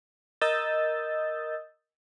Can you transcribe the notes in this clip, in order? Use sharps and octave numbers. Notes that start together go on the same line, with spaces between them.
A#4 D#5 D#6 E6 G6 A6